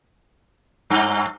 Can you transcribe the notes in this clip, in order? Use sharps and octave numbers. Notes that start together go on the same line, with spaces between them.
G2